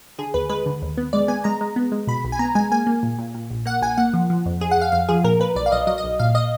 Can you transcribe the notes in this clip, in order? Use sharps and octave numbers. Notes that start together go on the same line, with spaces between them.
D3 G#4
D#2 B4
G#3 B4
D3
D#2
B3
G#3 D5
B3 G#5
G#3 A#5
G#3
B3
G#3
B2 B5
B1
G#5
B3 A#5
G#3 G#5
A#3 G#5
A#3
A#2
A#2
A#2
A#1
A#3 F#5
A#1 G#5
A#3 F#5
F3
F3
F2
F2 G#4
F#5
F2 F5
F2 F5
F3 G#4
A#2 A#4
A#2 B4
B1 D5
F5
B1 D#5
F#3 D#5
D#5
B1
A#2 F5
D#5